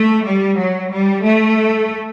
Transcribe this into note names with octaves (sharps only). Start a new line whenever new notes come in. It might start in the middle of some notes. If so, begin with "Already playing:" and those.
Already playing: A3
G3
F#3
G3
A3